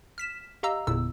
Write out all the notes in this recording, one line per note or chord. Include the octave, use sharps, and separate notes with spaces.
F6 B6 E7
G4 D#5 F5 A#5 E6
G1 E2 A#2 E4 E6